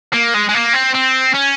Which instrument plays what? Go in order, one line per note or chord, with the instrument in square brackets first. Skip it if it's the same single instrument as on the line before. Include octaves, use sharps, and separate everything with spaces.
[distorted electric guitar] A#3
G#3
G#3
A#3
C4
C4
C#4